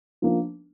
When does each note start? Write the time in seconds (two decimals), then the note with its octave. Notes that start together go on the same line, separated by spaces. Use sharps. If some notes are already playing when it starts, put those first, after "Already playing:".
0.22 F3 A#3 D4